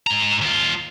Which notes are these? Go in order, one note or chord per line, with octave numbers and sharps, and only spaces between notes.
G#2 A#5
D#2 F4